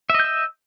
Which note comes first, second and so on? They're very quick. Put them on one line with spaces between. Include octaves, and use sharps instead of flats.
E5 D#5 G6 E6